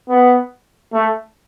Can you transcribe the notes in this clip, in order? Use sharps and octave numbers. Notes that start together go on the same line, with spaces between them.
B3
A3